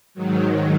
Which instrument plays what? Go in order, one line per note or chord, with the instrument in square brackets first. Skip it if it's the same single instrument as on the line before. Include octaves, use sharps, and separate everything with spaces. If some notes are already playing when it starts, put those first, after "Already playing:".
[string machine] G#2 D#3 F#3